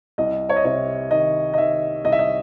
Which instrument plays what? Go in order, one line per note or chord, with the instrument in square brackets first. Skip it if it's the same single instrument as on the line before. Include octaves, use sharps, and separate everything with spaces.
[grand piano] C2 D#5
C#5
D#5
C3 C#5
D#3 D#5
D#5
D#3 E5
C2 D#5
E5
D#5